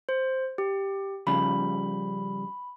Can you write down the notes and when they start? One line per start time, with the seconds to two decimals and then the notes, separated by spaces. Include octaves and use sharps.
0.09 C5
0.58 G4
1.27 C#3 F3 G3 B5